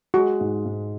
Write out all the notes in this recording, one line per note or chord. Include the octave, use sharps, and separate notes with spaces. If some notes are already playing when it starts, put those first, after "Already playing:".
G#3 F#4
G#2
G#2